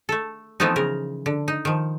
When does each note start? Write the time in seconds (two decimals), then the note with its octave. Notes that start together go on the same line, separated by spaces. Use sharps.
0.09 A3 A4
0.60 E3 F3 A3 B3 C4 D#4
0.76 C#3 A#4
1.26 D3
1.48 D#4
1.65 D#3 F3